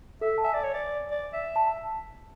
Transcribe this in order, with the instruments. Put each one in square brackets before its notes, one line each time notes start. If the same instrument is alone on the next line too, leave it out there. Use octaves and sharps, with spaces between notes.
[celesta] A4 [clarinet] E5
[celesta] A5
[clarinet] E5 [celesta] G#5
[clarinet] D5
C#5
D5
D5
E5
[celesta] A5